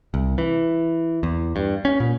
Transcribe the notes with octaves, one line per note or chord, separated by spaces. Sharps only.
C2
E3
E2
G2
C#4
A#2